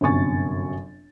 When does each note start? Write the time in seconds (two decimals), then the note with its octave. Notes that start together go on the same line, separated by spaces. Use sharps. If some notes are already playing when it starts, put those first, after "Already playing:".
0.01 G1 F#2 C3 G#5 C#6 A6